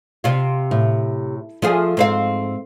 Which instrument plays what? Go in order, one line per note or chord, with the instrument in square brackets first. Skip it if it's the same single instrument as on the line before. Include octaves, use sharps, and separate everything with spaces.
[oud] C3 F4
[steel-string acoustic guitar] A2
[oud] F3 F4 G#4 [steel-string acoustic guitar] A3
[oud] G#2 C4 F5